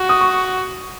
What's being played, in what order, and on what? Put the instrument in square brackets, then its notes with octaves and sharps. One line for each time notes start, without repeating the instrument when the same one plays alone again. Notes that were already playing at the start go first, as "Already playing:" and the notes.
Already playing: [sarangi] F#4
[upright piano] D#6
C#6